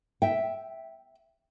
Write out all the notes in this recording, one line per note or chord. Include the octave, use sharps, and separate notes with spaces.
E5 G5